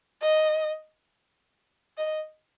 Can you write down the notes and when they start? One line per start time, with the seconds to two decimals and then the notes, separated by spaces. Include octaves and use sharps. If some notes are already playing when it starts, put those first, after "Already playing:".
0.21 D#5
1.98 D#5